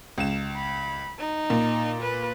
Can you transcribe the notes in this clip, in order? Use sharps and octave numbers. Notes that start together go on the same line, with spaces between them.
C#2 E7
B5
D#4
A#2
B4